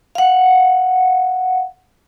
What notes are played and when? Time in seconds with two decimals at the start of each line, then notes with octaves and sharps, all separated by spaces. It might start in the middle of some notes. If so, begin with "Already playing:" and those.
0.15 F5 F#5